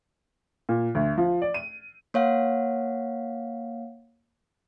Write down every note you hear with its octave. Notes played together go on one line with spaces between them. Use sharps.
A#2
D2
F3
D5
D#7
A#3 C#5 F5 F#5